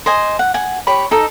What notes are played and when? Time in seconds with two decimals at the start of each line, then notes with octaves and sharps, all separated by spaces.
0.06 C5 D#5 G#5
0.39 F#5
0.54 F#5 G#5
0.87 G4 C#5 B5
1.11 D#4 A4 D#5